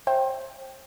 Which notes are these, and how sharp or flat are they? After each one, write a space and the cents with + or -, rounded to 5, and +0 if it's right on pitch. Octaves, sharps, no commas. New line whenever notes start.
C5 +30 E5 +0 G5 +0